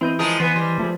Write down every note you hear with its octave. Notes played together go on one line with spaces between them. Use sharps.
E3 C4 E4 D#5 G6
F3 G#3 G#4 A#4
E3 B3 C5 D#5 G#5
G3 C6
F3 A3 G#4